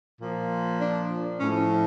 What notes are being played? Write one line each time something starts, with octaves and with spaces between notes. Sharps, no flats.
A#2 F3
D4
A2 F3 C#4